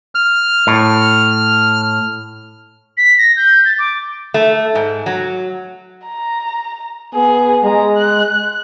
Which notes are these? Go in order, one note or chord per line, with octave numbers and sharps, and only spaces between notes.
F6
A2
B6
A#6
G6
A6
D6
A3
G#2
F#3
A#5
B3 G#4
G#3 A#5
F#6